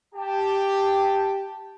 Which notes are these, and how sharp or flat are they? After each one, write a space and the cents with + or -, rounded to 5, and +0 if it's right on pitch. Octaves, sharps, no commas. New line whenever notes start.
G4 +0 A5 +0